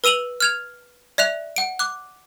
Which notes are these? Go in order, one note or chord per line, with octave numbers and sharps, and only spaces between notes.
B4 E6 D#7 F7 F#7
F6 G#6 F7
D5 E5 F#6 F7
F#5 D7
D6 F#6